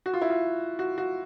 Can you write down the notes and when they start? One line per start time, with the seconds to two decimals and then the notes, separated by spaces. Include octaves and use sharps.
0.06 F#4
0.14 F4
0.22 E4
0.30 F4
0.79 F#4
0.98 F#4